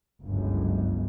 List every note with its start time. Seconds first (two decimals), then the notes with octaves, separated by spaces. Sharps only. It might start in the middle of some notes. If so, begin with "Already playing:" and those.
0.21 G1 C#2 F#2